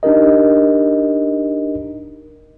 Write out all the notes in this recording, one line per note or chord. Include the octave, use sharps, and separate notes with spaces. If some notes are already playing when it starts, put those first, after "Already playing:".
D4 D#4 G4 A#4 D#5